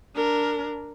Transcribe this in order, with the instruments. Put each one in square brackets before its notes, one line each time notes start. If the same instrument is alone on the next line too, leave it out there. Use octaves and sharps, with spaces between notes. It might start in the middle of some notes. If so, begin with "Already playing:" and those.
[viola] D4 A#4